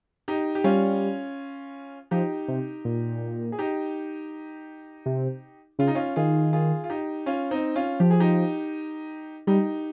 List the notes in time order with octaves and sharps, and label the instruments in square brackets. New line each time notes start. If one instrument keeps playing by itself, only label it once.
[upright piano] D#4 G4
G4
[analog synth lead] G3 [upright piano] C#4 F4
[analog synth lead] F3 [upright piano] D#4 G4
[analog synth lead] C3
A#2
[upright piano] G#4
D#4 G4
[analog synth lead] C3
[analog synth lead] C#3 [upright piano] F4
[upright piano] D#4
C#4 F4
[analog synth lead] D#3 [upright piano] F4 G#4
[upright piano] F4 G#4
F4
D#4 G4
C#4 F4
C4 D#4
C#4 F4
[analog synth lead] F3 [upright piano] G4
[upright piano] G#4
D#4 G4
[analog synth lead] G3 [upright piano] D#4 G4